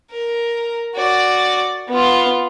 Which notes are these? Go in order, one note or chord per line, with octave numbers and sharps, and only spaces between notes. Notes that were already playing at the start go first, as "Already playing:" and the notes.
A#4
F#4 D5
B3 F4